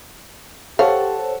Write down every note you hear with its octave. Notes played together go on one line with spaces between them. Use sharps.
G4 A4 C5 C#5 F5 F#5 A5 C#6